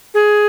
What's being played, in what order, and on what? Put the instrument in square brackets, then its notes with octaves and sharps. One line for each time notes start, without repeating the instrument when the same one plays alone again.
[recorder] G#4